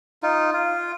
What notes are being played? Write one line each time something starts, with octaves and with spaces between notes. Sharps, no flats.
D#4 F4
F4